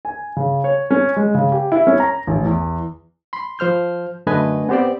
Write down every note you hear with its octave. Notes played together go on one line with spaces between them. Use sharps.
G#5
C#3
C#5
C#4
G#3
C#3
G4
E4
C#4
A#5
A1
E2
B5 C6
F3 C5 F6 G6
F#2 D3 A3 B4 D#5 G#5
B3 C4 G4 C5 D5